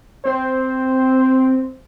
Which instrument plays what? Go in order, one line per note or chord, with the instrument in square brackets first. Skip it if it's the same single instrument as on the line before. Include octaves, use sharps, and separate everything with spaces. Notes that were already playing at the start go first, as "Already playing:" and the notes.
[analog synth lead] C4 [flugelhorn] C5